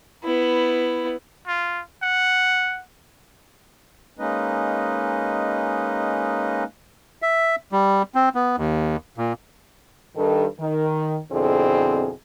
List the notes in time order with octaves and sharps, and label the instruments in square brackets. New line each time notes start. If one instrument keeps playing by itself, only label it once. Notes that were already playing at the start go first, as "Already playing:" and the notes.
[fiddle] B3 E4
[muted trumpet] F4
F#5
[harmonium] G#3 A#3 C#4 D#4 B4 D#5
[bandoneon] E5
G3
C4
B3
D#2
A#2
[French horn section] G2 D#3 A4
D#3
F2 B2 D3 C4 E4 G#4